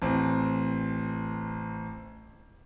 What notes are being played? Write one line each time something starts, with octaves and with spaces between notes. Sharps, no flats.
A1 C4